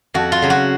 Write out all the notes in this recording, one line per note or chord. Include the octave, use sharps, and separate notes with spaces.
F2 F#4
F4
C#3 F#3
F#4